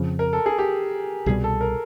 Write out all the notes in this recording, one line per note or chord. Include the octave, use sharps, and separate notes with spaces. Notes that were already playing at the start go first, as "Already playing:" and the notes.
Already playing: F2 C#3 F3
A#4
A4
G#4
G4
C2 B2 G3 G#4
A4
A#4